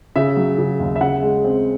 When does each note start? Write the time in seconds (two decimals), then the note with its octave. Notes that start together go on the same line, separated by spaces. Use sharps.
0.16 C#3 E5
0.37 F#3
0.58 C#3
0.80 D#2
0.96 E5
1.01 C#3 F#5
1.23 G#3
1.44 C4